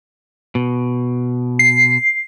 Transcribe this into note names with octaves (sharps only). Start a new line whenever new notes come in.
B2
C7